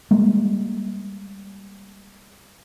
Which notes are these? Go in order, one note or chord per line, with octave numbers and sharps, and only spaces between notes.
G3 G#3 A#3